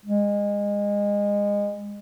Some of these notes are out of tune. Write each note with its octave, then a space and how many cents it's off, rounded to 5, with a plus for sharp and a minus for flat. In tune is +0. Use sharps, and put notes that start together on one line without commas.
G#3 -25